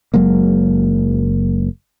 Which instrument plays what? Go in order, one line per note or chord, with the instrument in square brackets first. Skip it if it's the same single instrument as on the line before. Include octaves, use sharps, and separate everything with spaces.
[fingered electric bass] F#1 F#3 G#3 A#3